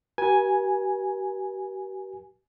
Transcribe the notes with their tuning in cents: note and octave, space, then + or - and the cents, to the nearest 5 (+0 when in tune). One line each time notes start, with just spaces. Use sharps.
G4 -40 B4 -45 G#5 +0